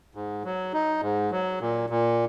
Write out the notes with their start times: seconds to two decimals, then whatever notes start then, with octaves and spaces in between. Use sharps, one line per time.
0.15 G#2
0.44 F#3
0.73 D#4
1.02 G#2
1.31 F#3
1.61 A#2
1.90 A#2